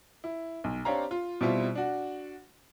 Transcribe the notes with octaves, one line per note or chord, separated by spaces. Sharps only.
E4
B1
C4 D4 G4 C#5 F5 A#5
F4
B2 G3 C4 E4 F4
D4 F#4